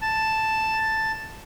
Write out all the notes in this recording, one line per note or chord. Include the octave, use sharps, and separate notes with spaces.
A5